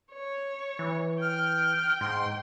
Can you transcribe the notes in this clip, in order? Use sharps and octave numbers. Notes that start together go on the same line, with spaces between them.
C#5
E3
G5 F6
G#2 C6